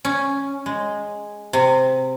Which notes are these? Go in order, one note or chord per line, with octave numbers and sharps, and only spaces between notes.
C#4
G#3
C3